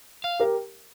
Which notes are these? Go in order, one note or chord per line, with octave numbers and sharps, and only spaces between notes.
F5
G4 A#4